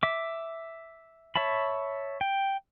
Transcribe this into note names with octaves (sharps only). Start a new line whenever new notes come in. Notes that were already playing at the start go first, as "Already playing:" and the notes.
E5 D6
C#5 E5 A5 B5
G5